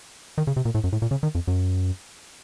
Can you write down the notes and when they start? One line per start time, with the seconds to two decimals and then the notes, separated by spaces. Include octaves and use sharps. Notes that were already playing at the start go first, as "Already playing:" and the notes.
0.38 D#3
0.47 C#3
0.57 C3
0.65 A#2
0.75 A2
0.84 F#2
0.93 A2
1.02 A#2
1.11 C#3
1.23 D#3
1.35 F2
1.47 F#2